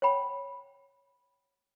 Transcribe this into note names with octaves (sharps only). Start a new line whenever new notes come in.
C#5 F#5 G5 B5